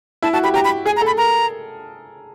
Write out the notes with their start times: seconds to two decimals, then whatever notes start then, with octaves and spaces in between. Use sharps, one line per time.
0.22 E4 A5
0.33 F#4 A5
0.44 G4 B5
0.54 G4 A#5
0.64 B5
0.86 G#4 G#5
0.96 A#5
1.01 A4
1.06 B5
1.17 A#4 A#5